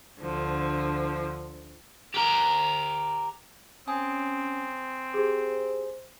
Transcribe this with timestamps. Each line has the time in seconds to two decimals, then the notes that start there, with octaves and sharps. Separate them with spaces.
0.21 D2 D3 F3
2.14 G4 A#4
3.87 C4 C#4 G#5 D#6
5.14 G4 G#4 C5